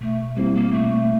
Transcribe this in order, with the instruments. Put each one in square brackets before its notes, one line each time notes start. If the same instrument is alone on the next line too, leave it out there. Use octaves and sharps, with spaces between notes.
[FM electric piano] B2 [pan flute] A3
[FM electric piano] G3 C4 E4 [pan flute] A#3
[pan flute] A#3
[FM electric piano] B2 [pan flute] A3